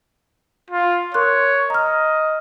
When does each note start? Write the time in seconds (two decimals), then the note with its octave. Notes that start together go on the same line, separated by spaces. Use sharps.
0.70 F4
1.14 A#4 C#5 C6 F#6
1.70 D#5 A#5 F6